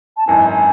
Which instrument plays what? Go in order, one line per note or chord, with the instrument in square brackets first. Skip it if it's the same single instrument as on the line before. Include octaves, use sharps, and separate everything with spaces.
[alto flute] A5
[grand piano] G#1 F#2 E3 [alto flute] G#5
[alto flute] G#5